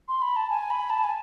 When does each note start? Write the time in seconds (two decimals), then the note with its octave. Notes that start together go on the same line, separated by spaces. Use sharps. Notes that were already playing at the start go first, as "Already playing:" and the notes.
0.08 C6
0.22 B5
0.36 A5
0.50 G#5
0.70 B5
0.90 A5
1.04 G#5